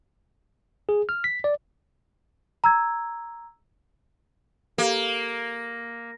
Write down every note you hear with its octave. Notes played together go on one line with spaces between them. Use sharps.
G#4
F6
B6
D5
A#5 E6 G#6
A#3 G4 A4 F5